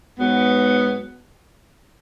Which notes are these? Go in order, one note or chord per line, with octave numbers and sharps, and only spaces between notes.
G#2 F#3 B3